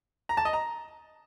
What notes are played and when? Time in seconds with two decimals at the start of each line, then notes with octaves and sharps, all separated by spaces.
0.29 A#5
0.37 A5
0.45 D#5
0.53 A#5